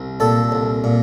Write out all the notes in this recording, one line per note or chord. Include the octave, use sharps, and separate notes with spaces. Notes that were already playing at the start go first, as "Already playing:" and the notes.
Already playing: C2
A#2 A4
C2
A#2